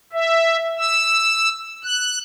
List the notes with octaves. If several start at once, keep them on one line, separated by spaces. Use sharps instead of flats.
E5
E6
F#6